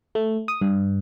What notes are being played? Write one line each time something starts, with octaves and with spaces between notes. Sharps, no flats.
A3
D#6
G2